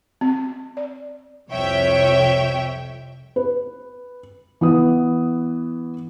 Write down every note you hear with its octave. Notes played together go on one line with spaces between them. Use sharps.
C4
D5
C2 F2 C#5 E5 G5
B4
E3 B3 D#6